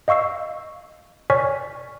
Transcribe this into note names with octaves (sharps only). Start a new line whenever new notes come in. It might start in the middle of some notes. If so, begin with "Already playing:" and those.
D#5 F5 C#6 E6 C7
C#5 D5 G#5 C#6 F6 B6